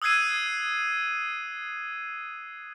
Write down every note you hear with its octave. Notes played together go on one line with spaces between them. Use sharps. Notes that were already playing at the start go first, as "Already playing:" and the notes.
D#6 E6 F#6 G#6 C7 D#7